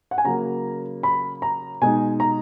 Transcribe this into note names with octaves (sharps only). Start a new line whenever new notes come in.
F#5
G#5
C#3 F#3 A#3 A#5
B5
A#5
B2 G#3 D#4 G#5
A#5